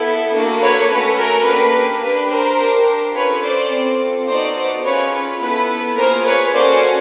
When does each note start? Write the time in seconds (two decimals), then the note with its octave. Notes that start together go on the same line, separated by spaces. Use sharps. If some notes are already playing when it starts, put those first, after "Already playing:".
Already playing: B3 E4 A4
0.34 A#3 D4 F#4 A4
0.62 B4 C#5
0.89 A3 C#4 F#4 A4 B4
1.18 A#4
1.46 A#3 D4 G4 B4
2.03 D4 G4 B4
2.30 A#4 C5
2.59 D4 G4
3.15 C#4 F4 A4 B4 C#5
3.43 C5 D5
3.71 C4 F4 A4
4.28 B3 D#4 F#4 A4 C5 D5
4.85 C#4 F4 G#4 B4 C#5
5.13 B4
5.40 B3 E4 A4 B4
5.97 A#3 C#4 F4 G#4 A#4 C5
6.26 B4 C#5
6.54 C#4 F#4 A4 C5 D5